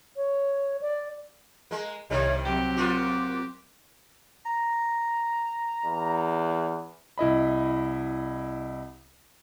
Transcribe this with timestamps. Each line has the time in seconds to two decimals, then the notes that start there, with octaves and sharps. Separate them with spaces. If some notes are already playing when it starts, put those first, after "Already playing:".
0.16 C#5
0.81 D5
1.71 G#3 A#3
2.10 C2 C3 D#3 G3 C#5
2.45 F#3 C4 G4 G5
2.77 A#3 F4 F#4 D6
4.46 A#5
5.85 E2
7.18 C2 E4 D#5 B5